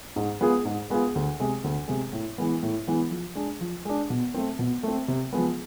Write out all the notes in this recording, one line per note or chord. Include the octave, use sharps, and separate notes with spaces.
G#2
G#3 B3 F4 G#4
G#2
G#3 B3 F4 G#4
D2
C3 G#3
D2
C3 G#3
A2
E3 G#3 B3
A2
E3 G#3 B3
F3
G#3 D4
F3
G#3 D4
B2
A3 C4
B2
A3 C4
C3
F3 G#3 B3